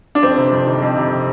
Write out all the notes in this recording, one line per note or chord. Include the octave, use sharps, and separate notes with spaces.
D4
F2 C4
C3
F2
D#3
F2
C3